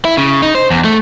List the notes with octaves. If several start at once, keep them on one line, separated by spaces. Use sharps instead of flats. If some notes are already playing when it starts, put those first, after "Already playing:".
E4
C#3
D#4
C5
E2
A3